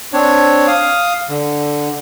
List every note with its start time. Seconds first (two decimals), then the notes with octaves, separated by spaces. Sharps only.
0.13 C4 D4 C#5
0.67 F5 D#6
1.29 D3